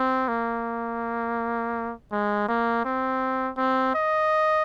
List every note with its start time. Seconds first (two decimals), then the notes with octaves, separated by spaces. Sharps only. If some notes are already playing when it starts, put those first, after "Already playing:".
Already playing: C4
0.28 A#3
2.12 G#3
2.48 A#3
2.85 C4
3.57 C4
3.95 D#5